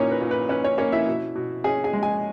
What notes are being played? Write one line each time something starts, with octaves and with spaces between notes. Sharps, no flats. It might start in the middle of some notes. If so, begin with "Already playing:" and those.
Already playing: A#2 A#3 C#4 D#4 E4 C#5 D#5 A#5
B4
A#2
B4
C#4 B4
C#4 C#5
A#3 C#4 C#5
E4 E5
B2
B2
C#4 G#4 G#5
G#4 G#5
G#3
G#4 G#5